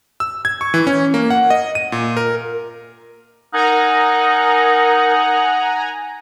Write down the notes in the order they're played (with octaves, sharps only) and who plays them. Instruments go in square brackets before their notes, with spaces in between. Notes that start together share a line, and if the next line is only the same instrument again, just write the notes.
[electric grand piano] E6
G#6
C#6
E3
C#4
A#3
F#5
D#5
D#7
A#2
A#4
[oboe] D#4 [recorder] A#4 [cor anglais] F#5 [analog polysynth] G#5 A#5